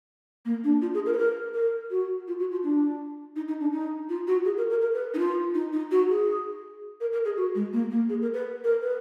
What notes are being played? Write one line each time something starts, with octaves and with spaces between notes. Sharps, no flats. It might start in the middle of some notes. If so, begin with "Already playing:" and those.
A#3
D4
F4
G#4
A#4
B4
A#4
A#4
F#4
F4
F#4
F4
D4
D#4
D#4
D4
D#4
F4
F#4
G#4
A#4
A#4
A#4
B4
D#4
F4
D#4
D#4
F#4
G#4
A#4
A#4
G#4
F#4
G#3
A#3
A#3
G#4
A#4
B4
A#4
B4